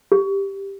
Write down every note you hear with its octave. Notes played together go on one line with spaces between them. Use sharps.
G4